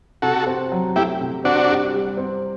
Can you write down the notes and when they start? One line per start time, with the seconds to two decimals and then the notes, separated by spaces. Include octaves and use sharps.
0.22 C3 F#4 A4
0.47 C4
0.72 F#3
0.96 A3 E4 G4
1.21 C3
1.44 C4 D4 F#4
1.69 G3
1.93 G3
2.17 C4